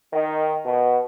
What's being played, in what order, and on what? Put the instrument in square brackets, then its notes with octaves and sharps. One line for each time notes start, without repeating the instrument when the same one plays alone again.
[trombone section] D#3
B2